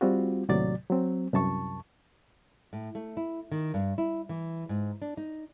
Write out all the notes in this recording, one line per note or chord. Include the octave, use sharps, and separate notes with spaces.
G3 C4 F4 F#4
D#2 A2 C3 F#3 D5 A6
F#3 C4
C2 F#2 A5 C#6
A2
A3
E4
D#3
G2
E4
E3
G#2
D4
D#4